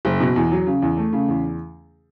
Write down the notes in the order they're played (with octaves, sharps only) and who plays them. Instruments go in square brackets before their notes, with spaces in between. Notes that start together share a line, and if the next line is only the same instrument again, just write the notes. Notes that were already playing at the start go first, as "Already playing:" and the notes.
[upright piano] F#1
B2
E2
F#3
C#3
E2
A3
C#3
E2